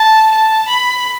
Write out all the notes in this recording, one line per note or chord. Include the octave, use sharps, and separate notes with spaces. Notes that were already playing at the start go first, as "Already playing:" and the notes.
Already playing: A5
A5
B5